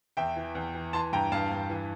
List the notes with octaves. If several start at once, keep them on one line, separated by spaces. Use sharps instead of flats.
E2 E5 G5
E3
E2
E3
E3 A5 C6
G2 G5 A#5
G2 F5 A5
G2
E3